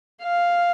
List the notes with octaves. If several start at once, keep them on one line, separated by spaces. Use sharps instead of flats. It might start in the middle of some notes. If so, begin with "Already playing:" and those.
F5